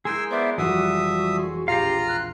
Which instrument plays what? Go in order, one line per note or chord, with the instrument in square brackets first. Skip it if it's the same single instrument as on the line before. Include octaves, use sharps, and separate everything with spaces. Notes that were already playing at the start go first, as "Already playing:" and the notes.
[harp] G#3 E4 [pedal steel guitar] G#4 A#4 G6 [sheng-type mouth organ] G#5 C6 E6
[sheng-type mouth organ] B3 C5 D5 [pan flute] E5
[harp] F1 E3 F#5 [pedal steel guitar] F3 G3 [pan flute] F#4 [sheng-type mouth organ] E5 D#6
[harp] G#4 C6 C#6
[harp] E1 A#1 [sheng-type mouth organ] F4 A#5 F6 [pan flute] G4 [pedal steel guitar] F5 G5
[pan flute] F#6